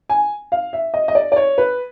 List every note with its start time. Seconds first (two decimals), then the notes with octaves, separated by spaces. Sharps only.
0.10 G#5
0.52 F5
0.73 E5
0.94 D#5
1.08 D#5
1.15 D5
1.32 D5
1.36 C#5
1.58 B4